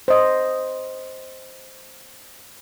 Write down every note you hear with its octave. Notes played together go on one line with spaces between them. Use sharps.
C5 D#5